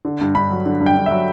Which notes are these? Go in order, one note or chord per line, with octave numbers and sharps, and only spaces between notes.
D3
G2
G2 B5
F#3
D3
G2
G5
G2
F#3 E5